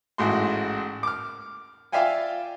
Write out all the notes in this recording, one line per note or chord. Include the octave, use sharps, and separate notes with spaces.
A1 G#2 F#4 C6
D6 F6
F4 D5 E5 F5 G5 G#5